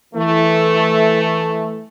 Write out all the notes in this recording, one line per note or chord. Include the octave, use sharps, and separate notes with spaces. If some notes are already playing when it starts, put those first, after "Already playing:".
E3 A3